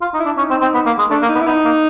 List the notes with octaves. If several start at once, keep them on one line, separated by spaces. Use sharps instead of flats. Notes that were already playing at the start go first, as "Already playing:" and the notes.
F4
D#4
E4
D4
C#4 D#4
C4
C4
B3
A#3
G#3
A3 D4
A#3
D#4
B3
E4
B3 D#4
A#3